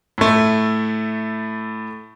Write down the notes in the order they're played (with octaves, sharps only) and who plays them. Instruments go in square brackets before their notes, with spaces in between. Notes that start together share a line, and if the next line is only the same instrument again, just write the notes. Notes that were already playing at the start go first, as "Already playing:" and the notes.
[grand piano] A2 A3